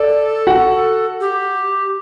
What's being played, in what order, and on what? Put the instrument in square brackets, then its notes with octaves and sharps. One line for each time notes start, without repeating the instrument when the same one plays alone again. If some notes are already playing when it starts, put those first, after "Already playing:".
Already playing: [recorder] A4 [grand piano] D5
[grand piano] F#4 F#5
[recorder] G4